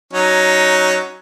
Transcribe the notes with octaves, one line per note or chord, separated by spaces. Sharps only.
F#3 C#4 D#4